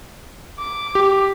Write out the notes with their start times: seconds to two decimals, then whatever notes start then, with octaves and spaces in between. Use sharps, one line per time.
0.59 D6
0.95 G4